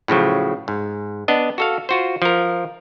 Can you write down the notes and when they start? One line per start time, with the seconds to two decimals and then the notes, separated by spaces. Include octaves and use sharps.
0.08 A2 C#3 F3 F#3
0.68 G#2
1.28 B3 D4 D#5
1.58 F#4 A4 F5
1.89 F4 F#4 C5
2.22 F3 A#4